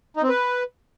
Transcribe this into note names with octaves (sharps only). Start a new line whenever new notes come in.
D#4
C4
B4